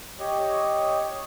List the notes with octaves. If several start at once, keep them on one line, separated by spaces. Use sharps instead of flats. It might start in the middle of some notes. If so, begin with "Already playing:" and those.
G4 C#5 D#5